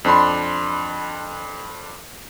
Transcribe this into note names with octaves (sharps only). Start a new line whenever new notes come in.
F2 D4 B5 C6